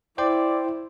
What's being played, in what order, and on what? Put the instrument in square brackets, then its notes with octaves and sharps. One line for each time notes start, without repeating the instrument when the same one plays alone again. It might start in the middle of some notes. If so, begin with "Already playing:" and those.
[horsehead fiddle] E4 [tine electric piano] C5 G5 C6 [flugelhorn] D5